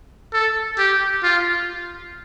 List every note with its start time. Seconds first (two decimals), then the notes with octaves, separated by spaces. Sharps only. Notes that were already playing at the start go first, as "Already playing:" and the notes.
0.33 A4
0.78 G4
1.23 F4